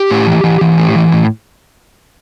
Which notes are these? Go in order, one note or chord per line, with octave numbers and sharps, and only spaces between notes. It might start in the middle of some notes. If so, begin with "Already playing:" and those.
Already playing: G4
A2
E3
E3
E3
A2
E3
A2